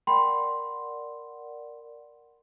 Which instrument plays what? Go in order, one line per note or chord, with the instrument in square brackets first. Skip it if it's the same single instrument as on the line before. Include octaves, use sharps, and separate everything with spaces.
[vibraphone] A#4 D5 F#5 [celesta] G5 B5 C6